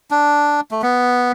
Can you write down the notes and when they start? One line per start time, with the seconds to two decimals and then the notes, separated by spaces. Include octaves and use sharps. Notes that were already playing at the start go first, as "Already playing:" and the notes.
0.11 D4
0.71 A3
0.82 B3